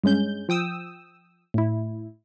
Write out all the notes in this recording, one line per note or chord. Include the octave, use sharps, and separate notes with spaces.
G2 G#3 C#4 G6
F3 G5 D#6 E6
A2 E4